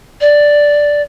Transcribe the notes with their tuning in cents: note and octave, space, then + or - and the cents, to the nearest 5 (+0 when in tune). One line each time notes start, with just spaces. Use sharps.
D5 +0